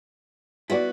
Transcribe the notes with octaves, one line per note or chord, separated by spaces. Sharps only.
B3 E4 F#4 D5